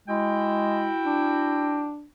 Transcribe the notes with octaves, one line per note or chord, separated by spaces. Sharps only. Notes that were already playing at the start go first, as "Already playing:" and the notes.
G#3 E4 F#4 G5
D4